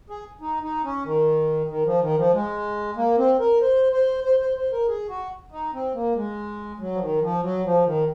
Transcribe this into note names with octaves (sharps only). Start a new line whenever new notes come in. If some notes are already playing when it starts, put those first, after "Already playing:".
G#4
D#4
D#4
C#4
D#3
D#3
F3
D#3
F3
G#3
A#3
C4
A#4
C5
C5
C5
C5
C5
A#4
G#4
F#4
D#4
C4
A#3
G#3
F#3
F3
D#3
F3
F#3
F3
D#3